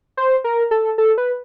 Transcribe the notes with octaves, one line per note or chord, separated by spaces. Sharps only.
C5
A#4
A4
A4
B4